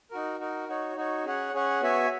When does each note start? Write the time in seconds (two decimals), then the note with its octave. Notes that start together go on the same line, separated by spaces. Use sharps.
0.11 D#4 F#4 A#4
0.40 D#4 F#4 A#4
0.68 D#4 F#4 C#5
0.96 D#4 F#4 C#5
1.25 C#4 G#4 C#5 F#5
1.53 C#4 G#4 C#5 F#5
1.81 B3 F#4 C#5 E5 G#5